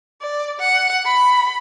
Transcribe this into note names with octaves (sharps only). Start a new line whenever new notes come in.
D5
F#5
B5